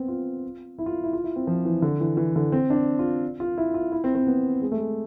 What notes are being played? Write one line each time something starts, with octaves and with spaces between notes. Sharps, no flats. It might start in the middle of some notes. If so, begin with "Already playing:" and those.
Already playing: B3 C4
F4
E4
F4
E4
F4
E4
C4
F3
E3
D3
E3
E3
D3
C4
D4
F4
F4
E4
F4
E4
C4
C4
B3
G#3
A3
G#3